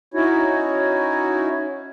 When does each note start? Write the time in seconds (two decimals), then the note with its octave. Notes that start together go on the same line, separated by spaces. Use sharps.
0.14 C#4 D#4 E4 F#4 C#5